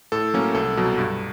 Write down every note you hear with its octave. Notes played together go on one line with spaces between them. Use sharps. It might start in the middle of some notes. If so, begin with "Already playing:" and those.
A2 A4
F#3 A#3 C#4
C2 A4
B2 F#3
G2